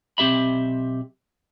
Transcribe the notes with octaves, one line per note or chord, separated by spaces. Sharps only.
B1 C4 G4 E5 B5